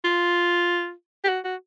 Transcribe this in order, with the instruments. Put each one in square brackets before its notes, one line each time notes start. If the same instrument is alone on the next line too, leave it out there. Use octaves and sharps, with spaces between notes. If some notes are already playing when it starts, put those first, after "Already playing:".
[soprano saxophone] F4
G4
F#4
F#4